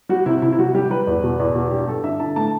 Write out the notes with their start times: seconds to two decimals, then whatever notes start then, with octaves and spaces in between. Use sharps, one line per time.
0.09 G3 F#4
0.26 C3 E4
0.42 C3 E4
0.52 E4
0.59 G3 F#4
0.75 G3 G4
0.90 G3 B4
1.07 E2
1.23 B2
1.39 E2
1.55 B2
1.71 G2 G4
1.88 G3 A4
2.04 D3 E5
2.20 D3 A5
2.36 A2 A5